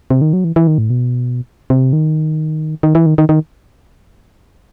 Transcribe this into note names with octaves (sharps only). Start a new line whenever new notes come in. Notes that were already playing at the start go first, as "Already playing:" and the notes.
C3
D#3
F#3
E3
E3
D#3
A2
B2
C3
D#3
D#3
E3
D#3
D#3
D#3